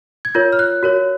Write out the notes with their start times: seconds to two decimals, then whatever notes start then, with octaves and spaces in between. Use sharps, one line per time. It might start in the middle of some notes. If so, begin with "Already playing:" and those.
0.25 G#6
0.35 F4 A#4 C#5 G6
0.53 F6
0.59 F#6
0.83 F#4 A#4 C#5